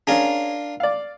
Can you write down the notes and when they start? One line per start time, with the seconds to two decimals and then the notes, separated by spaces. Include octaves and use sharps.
0.07 C#4 D4 F4 G#4 A#4
0.80 D5 F5